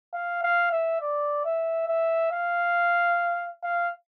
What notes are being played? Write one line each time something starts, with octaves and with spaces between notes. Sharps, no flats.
F5
F5
E5
D5
E5
E5
F5
F5